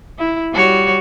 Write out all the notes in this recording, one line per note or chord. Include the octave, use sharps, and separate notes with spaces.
E4
G3 F#4 C#5